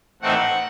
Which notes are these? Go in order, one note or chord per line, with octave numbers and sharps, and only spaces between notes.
A2 E3 A3 C4 D#4 F#5